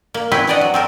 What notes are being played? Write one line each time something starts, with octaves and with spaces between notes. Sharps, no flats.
A#3
C4 C#4 E4 B4 C5
E3 D4 D5 D#5 F#5
F#3
C4 A4 A#4